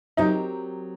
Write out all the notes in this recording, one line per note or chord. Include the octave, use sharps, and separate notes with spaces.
F#3 C4 D#4 G4 A#4